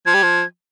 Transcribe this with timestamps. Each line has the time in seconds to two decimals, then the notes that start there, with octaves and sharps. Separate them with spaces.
0.06 F3 G#6
0.14 G3
0.23 F3